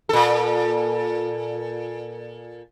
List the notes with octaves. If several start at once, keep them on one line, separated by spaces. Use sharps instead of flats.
A#2 A4